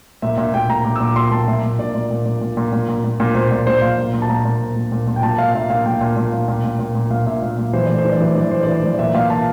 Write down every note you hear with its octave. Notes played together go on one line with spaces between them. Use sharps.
A#2 E5
A#2 E5
A#2 G5
A#2 A#5
A#2 D6
E6
A#2 D6
A#2 C6
A#2 A5
A#2 E5
A#2
A#2 D5
A#2
A#2
A#2
A#2
A#2
A#2
A#2
A#2
A#2
A#2 C5
A#2 D5
A#2 C5
A#2 F5
A#2
A#2
A5
A#2 A#5
A#2
A#2
A#2
A#2
A#2
G5
A#2 A5
A#2 F5
A#2 E5
A#2 F5
A#2 G5
A#2
A#2
A#2
A#2
A#2
A#2
A#2
A#2 F5
A#2 E5
A#2
A#2
E3 C5
A2 D5
C5
E3
D5
E3 C5
E3 D5
A2 C5
E3 D5
C5
E3
D5
A#2 E5
A#2 F5
A#2 A5